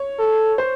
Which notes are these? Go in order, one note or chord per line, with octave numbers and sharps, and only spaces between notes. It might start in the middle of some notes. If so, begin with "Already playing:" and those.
Already playing: C#5
A4
C5